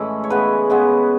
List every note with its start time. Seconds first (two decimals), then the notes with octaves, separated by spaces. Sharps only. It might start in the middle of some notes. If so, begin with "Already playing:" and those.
Already playing: A2 E3 G#3 C#4
0.24 C#5
0.30 C#3 G#3 B3 B4
0.70 C#3 G#3 B3